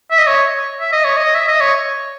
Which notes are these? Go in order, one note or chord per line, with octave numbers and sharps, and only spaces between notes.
E5
D#5
C#5
E5
D#5
C#5
D#5
E5
D#5
C#5